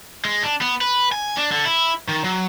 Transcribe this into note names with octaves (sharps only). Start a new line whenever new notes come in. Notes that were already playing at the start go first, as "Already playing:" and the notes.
G#3
D4
B3
B4
G#5
D4
D3
E4
D#3
F#3